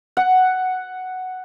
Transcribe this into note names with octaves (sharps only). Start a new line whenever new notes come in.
F#5